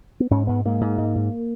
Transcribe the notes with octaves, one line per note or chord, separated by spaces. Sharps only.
B3
G#2 C#4
G#2 B3
G#2 A#3
G#2
G#2
G#2